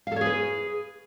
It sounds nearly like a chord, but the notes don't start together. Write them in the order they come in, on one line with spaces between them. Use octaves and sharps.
F5 A4 C#5 G#4 B4